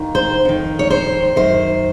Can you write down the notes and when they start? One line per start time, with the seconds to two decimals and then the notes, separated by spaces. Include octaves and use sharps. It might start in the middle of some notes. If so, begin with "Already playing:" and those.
Already playing: D#2 D#3
0.15 C5
0.45 F2 D#3
0.79 C#5
0.90 C5
1.36 F#2 D#3 C5